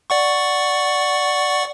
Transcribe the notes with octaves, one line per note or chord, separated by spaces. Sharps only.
D5 F#5 C#6